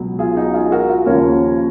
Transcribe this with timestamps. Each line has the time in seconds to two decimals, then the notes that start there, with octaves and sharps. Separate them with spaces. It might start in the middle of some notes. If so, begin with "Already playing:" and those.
Already playing: C#2 B2 F#3
0.19 F4 G#4
0.37 D#4 F#4
0.54 F4 G#4
0.72 F#4 A#4
0.89 F4
1.06 D#2 C#3 F3 A#4 C#5